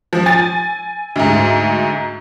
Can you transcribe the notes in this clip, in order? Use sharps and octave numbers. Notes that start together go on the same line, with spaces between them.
F3
G#5 A6
D2 G#2